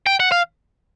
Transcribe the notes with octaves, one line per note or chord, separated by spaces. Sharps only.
G5
F#5
F5